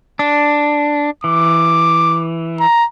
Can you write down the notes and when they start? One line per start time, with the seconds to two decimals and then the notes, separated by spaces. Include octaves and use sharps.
0.19 D4
1.24 E3 D6
2.60 A#5